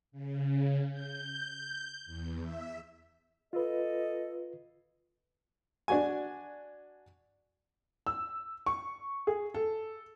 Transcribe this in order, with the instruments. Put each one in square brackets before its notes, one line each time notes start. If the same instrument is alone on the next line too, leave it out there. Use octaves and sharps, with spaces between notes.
[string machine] C#3
G6
E2
E5
[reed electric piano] F4 B4 [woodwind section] A4 D#5
[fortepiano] D4 F#4 G#5
[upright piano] E6
C#6
G#4
A4